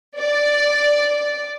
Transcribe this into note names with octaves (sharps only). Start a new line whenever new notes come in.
D5